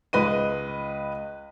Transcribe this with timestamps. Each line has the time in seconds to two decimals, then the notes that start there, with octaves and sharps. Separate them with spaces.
0.13 C#2 B4 D#5 D#7